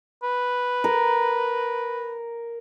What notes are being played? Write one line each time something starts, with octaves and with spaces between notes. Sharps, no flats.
B4
A#4